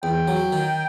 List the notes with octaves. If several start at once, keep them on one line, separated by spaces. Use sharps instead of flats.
E2 G5
F#3
D#3